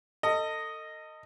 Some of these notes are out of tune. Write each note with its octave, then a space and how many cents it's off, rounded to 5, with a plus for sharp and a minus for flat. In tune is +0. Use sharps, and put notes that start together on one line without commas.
A4 +40 D#5 +0